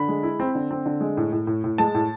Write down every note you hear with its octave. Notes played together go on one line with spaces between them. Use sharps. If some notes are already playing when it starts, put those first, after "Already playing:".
Already playing: D3 B5
G#3
E4
C4
D3
C4
D3
G#3
A2
A2
A2
A2
G#3 A5
A2